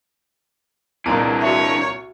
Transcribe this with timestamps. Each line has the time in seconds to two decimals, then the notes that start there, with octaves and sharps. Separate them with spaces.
1.06 C2 A#2 E3 D4 G#5 A#5
1.42 F#4 C#5 E5